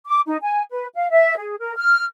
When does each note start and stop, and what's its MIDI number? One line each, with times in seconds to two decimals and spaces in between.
0.07 0.20 86
0.26 0.37 63
0.42 0.62 80
0.72 0.85 71
0.94 1.08 77
1.11 1.37 76
1.37 1.55 68
1.59 1.72 70
1.77 2.03 89